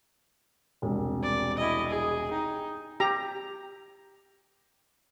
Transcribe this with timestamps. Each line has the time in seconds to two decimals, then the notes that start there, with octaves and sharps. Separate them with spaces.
0.82 E1 C2
1.22 D5
1.57 E4 D#5
1.88 G#4
2.31 D#4 G5
3.00 G4 A#5